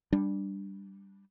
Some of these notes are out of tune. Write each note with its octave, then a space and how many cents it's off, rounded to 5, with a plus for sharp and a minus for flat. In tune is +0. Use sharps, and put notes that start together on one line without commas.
G3 +0 D4 +0